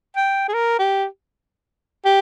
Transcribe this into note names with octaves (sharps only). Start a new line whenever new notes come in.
G5
G#4
A#4
G4
G4